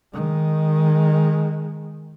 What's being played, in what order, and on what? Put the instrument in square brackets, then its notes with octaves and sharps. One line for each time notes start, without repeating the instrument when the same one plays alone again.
[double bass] D#3 G#3